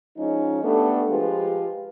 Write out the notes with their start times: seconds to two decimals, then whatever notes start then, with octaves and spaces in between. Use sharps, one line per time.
0.17 F3 G#3 C#4 D#4
0.63 A3 B3 D4 G4 A4
1.10 F3 G#3 F4 G4 B4